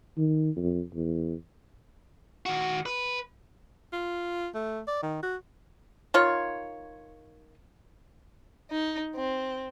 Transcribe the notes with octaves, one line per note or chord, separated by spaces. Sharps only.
D#3
F2
E2
D#3 F#4
B4
F4
A3
D5
D#3
F#4
D#3 F4 C#5
D#4
C4